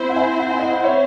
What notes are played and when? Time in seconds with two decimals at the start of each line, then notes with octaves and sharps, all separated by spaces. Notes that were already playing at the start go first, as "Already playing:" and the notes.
Already playing: C4 E4 C5
0.09 F#5
0.16 E5 G#5
0.39 F#5
0.49 G#5
0.59 D#5 F#5
0.73 F#5
0.84 C#5 E5